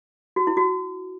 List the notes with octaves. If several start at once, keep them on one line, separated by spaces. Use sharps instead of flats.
F#4
E4
F#4